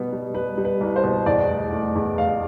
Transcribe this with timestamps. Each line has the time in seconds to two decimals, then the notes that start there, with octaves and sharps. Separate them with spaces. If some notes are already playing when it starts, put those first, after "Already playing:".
Already playing: B2 G3 B3
0.12 G3
0.34 G3 B4
0.58 G3
0.65 B4
0.81 C2
0.96 C5
1.04 B2
1.26 E2 D5
1.49 F1
1.73 A3
1.96 E2
2.18 F1 F5